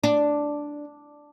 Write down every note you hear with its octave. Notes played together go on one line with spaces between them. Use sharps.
D4